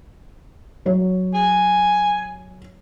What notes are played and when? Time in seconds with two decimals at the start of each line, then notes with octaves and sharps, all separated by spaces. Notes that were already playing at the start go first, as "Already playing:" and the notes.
0.85 F#3 C#5
1.34 G#5